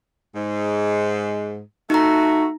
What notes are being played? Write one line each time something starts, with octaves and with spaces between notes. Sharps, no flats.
G#2
A3 D#4 F#4 A#5